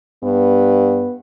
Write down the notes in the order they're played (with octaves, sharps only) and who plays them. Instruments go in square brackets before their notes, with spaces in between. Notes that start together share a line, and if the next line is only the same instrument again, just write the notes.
[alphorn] G2 [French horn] B3